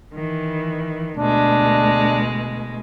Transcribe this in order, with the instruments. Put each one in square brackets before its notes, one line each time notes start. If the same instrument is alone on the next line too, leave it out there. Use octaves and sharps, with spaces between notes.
[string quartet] D#3 E3
[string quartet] D2 B2 G#3 [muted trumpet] D4